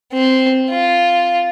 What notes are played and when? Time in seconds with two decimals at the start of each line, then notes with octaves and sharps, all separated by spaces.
0.13 C4
0.70 F4